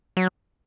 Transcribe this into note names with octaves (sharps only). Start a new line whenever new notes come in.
F#3